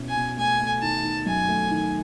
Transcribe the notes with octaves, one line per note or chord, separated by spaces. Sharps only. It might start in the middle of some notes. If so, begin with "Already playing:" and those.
Already playing: B2 C#4 E4
G#5
B2
A3 G#5
A3
D#3 A5
D#3
F#2 G#5
A3
D#3